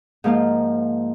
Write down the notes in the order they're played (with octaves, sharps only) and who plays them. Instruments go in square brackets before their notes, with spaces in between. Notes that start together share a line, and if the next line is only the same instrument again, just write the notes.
[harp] G#2 F3 A#3 F4